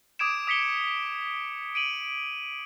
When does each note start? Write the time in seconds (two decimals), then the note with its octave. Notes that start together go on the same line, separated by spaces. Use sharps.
0.19 D6 D#6 G#6 D7 E7
0.47 D#6 B6 C#7 G7
1.75 D7 D#7 F#7